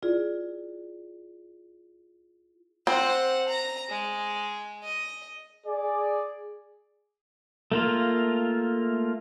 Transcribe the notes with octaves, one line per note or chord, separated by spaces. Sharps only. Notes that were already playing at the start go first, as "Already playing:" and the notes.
E4 F4 G#4 D5
C4 C5 F#5
A#5
G#3
D#5
G#4 D5
A3 A#3 F4